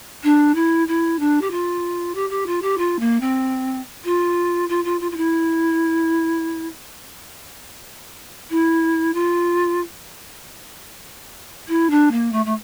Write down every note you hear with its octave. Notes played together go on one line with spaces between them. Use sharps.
D4
E4
E4
D4
G4
F4
G4
G4
F4
G4
F4
A#3
C4
F4
F4
F4
F4
F4
E4
E4
F4
E4
D4
A#3
A3
A3